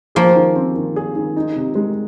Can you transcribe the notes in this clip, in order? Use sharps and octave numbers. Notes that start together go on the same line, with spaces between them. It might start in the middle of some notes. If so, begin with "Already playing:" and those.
F3 A#3 G#4
D#3
C4
D#3
G#4
D#3
D#4
C3
G#3